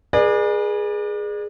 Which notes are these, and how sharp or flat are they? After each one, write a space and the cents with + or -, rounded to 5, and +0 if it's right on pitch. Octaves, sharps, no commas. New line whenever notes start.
G#4 +0 B4 -40 D5 +30